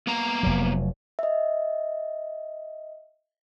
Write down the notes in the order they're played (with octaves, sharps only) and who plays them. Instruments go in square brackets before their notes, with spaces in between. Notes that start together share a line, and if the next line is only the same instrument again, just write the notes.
[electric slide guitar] A#3 B3 A#5
[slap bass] F1 F#3
[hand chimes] D#5 E5